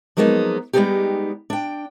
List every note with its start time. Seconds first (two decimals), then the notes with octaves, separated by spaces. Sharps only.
0.17 F3 F#3 G#3 A#3 B3 D#4
0.73 G3 G#3 B3 C4 D#4 G4
1.50 D4 G5